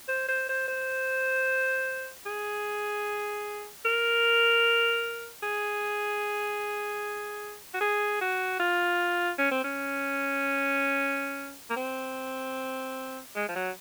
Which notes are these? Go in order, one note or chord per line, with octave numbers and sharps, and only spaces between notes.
C5
C5
C5
C5
G#4
A#4
G#4
F#4
G#4
F#4
F4
C#4
C4
C#4
A#3
C4
G#3
F3
F#3